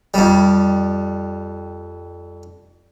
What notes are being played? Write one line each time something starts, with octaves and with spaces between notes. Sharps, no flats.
F2 G3